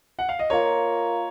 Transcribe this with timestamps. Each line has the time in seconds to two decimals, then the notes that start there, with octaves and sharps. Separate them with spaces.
0.19 F#5
0.29 F5
0.39 D#5
0.50 A#3 F4 A#4 C#5